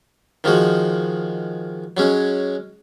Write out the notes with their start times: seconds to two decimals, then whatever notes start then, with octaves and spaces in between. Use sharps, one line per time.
0.44 D#3 F3 G#3 F#4
1.97 F#3 G#3 C#4